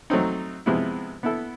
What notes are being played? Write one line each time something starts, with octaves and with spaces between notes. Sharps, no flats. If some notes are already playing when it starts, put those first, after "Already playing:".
F#3 A3 C4 D#4
C3 F3 G#3 B3 E4
B3 E4 A4